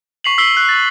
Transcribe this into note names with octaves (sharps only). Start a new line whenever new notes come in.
C#6 B6 C7 F7 F#7
E6 B6 C7 F#7 G7
F#6 C7
A6